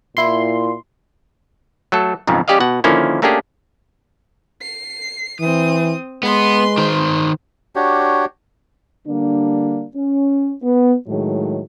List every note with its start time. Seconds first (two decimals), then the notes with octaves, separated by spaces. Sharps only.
0.17 A#2 E4 C6
1.92 F#3 A3 A4
2.27 B1 F2 G#2 C#3
2.48 G3 C#4 G4 D5 D#5 F5
2.60 B2 F#5
2.84 D3 D#3 F3 A#3 C#4 E4
3.22 A3 A#3 C#4 D4 G4 G#4
4.62 C7
5.41 E3 C4 D#6
6.23 G#3 B3 B4 C6
6.78 D#3 C5
7.76 D4 F#4 G4 C#5
9.07 D3 G3 A#3 D4
9.96 C#4
10.63 B3
11.08 A2 D#3 F#3 G#3